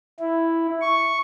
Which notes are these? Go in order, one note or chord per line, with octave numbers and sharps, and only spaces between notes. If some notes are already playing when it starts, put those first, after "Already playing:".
E4
C#6